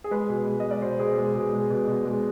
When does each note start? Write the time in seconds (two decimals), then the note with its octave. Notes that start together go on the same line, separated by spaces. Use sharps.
0.04 G#4
0.11 G#3 B4
0.29 B2
0.47 G#3
0.60 G#3 D#5
0.71 D5
0.82 B2 C5
1.00 B2 G#4
1.17 G#3 G#4
1.35 B2 G#4
1.53 G#3
1.70 B2
1.88 B2
2.06 G#3